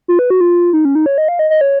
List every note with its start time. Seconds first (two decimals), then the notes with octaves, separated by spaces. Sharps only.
0.08 F4
0.19 B4
0.30 F#4
0.41 F4
0.73 D#4
0.85 C#4
0.95 D#4
1.06 C#5
1.18 D#5
1.28 F5
1.39 D#5
1.50 D#5
1.61 C#5